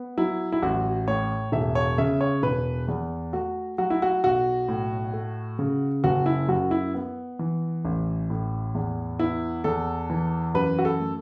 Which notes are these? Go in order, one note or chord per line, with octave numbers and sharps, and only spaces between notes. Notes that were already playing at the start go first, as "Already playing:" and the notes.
Already playing: B3
F#3 E4
E4
A1 F#4
A2 C#5
E1 E5
C#5
C#3 E5
C#5
E1 B4
E2
A3 F#4
F#3 F#4
E4
F#4
B1 F#4
A2
A3
C#3
F#1 F#4
E4
F#2 F#4
E4
B3
E3
A1
A2
E2
B3 E4
E2 A4
E3
F#2 B4
F#4
A4
A3